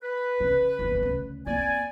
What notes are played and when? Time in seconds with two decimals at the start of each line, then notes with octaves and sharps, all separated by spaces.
0.03 B4
0.40 C#3
0.79 G1 D#2
1.03 D2 C#3
1.47 F2 A#3 D5 G#5